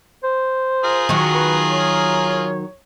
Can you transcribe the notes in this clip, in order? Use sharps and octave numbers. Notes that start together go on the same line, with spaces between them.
C5
F4 G#4 A#4
D#3 F#3
B4
C#5